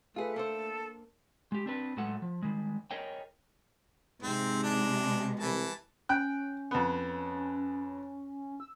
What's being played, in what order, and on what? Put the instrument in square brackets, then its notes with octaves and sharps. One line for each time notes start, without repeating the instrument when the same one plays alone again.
[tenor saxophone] A3 [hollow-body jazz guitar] F4 G#4 [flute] B4
[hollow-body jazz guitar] A#3 D4 C5 [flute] A4
[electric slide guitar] G#3 G4
C4 D4 B4
A2 F#3 G#3 A4 F#5
F3
D#3 G3 G#3
G#4 A#4 C#5 D#5 G5
[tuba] G#2 [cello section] C3 G#3 [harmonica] C4
[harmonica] D4
[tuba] C2 [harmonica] E3 A5
[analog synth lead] C#4 [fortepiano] G5 F#6
[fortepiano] F2 B3
[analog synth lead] E6